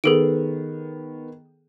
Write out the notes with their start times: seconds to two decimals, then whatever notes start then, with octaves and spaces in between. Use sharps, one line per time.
0.04 D#3 B3 G#4 A4 D7